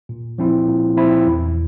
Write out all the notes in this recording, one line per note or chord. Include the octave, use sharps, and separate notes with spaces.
A#2
F3 C4 E4
A#2
F3 C4 E4
E2